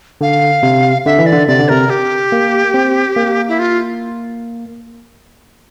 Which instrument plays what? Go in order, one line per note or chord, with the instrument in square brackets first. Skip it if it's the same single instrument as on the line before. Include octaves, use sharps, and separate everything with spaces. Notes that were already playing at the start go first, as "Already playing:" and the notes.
[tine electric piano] D3 [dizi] F5
[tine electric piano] C3
[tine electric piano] D3 [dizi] E5
[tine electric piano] E3
[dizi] D5
[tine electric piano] D3
[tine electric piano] C3 [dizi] D5
[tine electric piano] D3
[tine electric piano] C3 [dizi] A#4
[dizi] G4
[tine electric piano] A#3
C4
A#3
[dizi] E4
F4